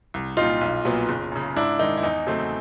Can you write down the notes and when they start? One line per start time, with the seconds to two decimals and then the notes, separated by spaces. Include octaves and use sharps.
0.14 C2
0.37 A#2 G3 D#4 F4
0.61 B1
0.85 A#2 F#3 B3
1.09 F#1
1.32 F#2 C#3
1.56 G#2 D4 E4
1.79 D#3 G#3 D#4
1.97 E4
2.03 E2 D#4
2.27 C#3 F#3 A3 C4